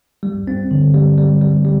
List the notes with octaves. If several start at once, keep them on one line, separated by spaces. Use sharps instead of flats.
G3
C4
D3
G3
G3
G3
G3